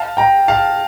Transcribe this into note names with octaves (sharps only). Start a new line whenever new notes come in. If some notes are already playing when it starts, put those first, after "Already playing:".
Already playing: F5 A5
G5 A#5
F5 A5